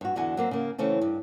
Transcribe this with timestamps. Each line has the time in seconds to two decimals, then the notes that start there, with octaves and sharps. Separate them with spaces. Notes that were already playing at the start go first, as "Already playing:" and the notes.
0.01 G2 F#4
0.16 E2 D3 F#4 G#5
0.37 F#3 A#3 C4
0.51 C#3 A#3
0.78 C#3 E3 A3 C4 C#4
1.01 G2